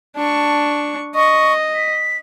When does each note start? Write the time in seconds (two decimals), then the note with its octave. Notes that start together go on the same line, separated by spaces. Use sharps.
0.16 D4 A5 C#6
1.15 D#5 C#6
1.75 B6